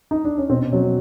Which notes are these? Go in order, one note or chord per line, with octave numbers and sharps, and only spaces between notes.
D#4
D4
C#4
B2 C4
F#3 C#4